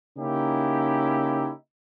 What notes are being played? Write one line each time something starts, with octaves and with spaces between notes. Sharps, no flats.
C#3 A#3 C#4 D#4 E4 G4